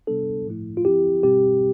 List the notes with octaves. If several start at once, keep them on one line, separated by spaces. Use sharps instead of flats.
C3 G3 B3 D4 A4
A2 F3 A3 E4
F4
F3 C4 E4 G4
B2 G3 C4 G4